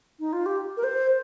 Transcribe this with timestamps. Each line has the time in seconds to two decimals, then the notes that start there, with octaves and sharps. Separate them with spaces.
0.20 D#4
0.33 F4
0.46 G4
0.77 A#4
0.83 C5